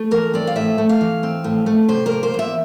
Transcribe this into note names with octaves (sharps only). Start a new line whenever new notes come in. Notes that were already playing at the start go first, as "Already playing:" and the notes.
Already playing: A3
E3 A#4
C4 D5
F5
A2 E5
A3
F5
E3
C4
A2
A3
C3 C5
A#4
A#3
C5
E2 E5